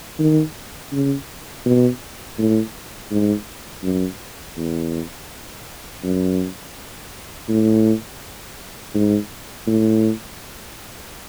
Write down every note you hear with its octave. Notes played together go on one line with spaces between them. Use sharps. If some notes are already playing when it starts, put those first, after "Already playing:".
D#3
C#3
B2
A2
G#2
F#2
E2
F#2
A2
G#2
A2